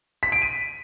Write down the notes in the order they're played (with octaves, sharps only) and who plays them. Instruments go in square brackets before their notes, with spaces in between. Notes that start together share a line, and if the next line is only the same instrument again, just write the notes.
[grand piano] B6
D7
D#7